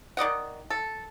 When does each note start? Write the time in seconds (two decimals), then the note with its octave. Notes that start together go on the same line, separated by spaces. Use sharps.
0.17 D#3 D5 D#5 F#5
0.70 A4